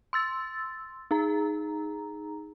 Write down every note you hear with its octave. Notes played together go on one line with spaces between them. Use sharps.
C6 E6 A6
D#4 G#4 A#5